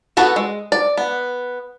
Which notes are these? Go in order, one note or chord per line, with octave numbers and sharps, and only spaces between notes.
B3 F#4 A4 B4
G#3
D5
B3